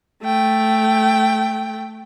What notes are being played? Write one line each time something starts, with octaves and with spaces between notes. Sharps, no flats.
A3 G5